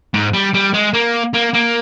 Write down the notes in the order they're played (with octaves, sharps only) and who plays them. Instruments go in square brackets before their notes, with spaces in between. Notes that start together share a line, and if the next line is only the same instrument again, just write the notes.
[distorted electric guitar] G#2
G3
G3
G#3
A#3
A#3
A#3